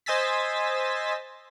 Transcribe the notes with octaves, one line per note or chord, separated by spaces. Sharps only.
C5 D#5 G#5 E6 A6 B6